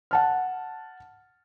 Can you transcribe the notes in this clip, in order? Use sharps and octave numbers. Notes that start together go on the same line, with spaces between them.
F#5 A5 F6